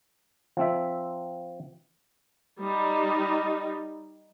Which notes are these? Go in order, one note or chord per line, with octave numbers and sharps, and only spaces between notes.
F3 C4 E5
G3 D#4